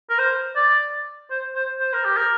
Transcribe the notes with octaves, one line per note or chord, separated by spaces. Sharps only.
A#4
C5
D5
C5
C5
C5
A#4
G4
A#4